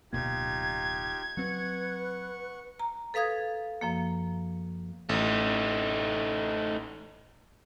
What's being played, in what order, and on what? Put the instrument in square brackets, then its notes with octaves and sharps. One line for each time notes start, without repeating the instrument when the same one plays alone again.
[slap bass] D1 B2 A#3 [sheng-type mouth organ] D#4 F4 G4 [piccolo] G#6
[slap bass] F#3 C4 [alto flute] B4 [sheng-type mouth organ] F#5 C#6
[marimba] A#5
A4 B4 F5 D#6 G#6
F#2 F3 A#3
[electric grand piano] A1 [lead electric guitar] A3 D#4